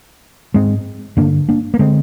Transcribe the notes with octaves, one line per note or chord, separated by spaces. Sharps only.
G#2 G#3 C4
G2 D3 A#3 D4
A#3 D4
A#3
D3 G#3 C4